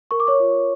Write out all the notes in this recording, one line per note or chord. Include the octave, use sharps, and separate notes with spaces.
A#4 C#6
D6
C#5 C#6
F4